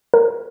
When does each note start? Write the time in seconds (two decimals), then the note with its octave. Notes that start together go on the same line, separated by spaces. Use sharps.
0.14 A#4